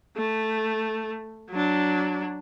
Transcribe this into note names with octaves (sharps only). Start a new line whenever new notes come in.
A3
F#3 D4